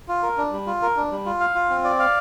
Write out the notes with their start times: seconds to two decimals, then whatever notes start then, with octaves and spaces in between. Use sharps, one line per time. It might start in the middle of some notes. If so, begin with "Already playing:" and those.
0.08 F4
0.23 A#4
0.38 D4
0.52 G3
0.67 F4
0.82 A#4
0.97 D4
1.11 G3
1.26 F4
1.40 F5
1.55 F4
1.70 C4
1.84 D5
1.99 F5